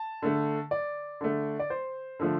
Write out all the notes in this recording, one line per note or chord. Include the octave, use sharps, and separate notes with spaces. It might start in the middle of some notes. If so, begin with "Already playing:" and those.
Already playing: A5
D3 A3
D5
D3 A3
D5
C5
D3 F3 A3